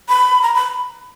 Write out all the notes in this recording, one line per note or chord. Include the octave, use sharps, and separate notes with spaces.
B5
A#5
B5